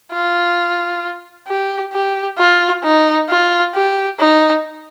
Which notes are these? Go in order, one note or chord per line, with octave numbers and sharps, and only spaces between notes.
F4
G4
G4
F4
D#4
F4
G4
D#4